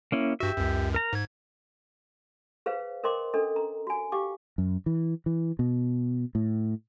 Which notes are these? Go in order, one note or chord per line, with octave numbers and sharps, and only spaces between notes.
A#3 C#4 E4
G2 F#4 G4 E5
C#2 F#2
A#4 A#5
G#2 G#6
G#4 B4 C5 F5
A#4 C5 D#5 G5 C6 D6
C#4 D4 A4 D#5
A#5
F#4 G#5
G4 F5 G5 D6
F#2
E3
E3
B2
A2